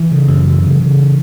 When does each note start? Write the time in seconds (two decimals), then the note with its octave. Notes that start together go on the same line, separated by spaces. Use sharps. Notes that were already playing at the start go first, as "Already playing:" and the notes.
Already playing: E3
0.12 C#3
0.28 F#2
0.46 C#3
0.63 C#3
0.81 C#3